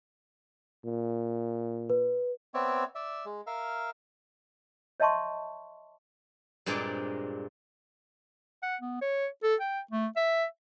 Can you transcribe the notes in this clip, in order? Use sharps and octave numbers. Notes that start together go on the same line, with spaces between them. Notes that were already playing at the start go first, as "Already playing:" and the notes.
A#2
B4
B3 C4 C#5 D5 E5
D5 E5
G#3
A#4 E5 F5
C#5 D#5 E5 A5 C6 C#6
G2 A#2 G#3 A#3 C4 D5
F#5
B3
C#5
A4
G5
A3
E5